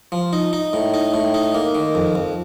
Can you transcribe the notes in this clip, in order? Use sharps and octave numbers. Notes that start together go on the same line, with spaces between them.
F3
D#4
D#4
A2
D#4
A2
D#4
A#3
D#3
F2
F2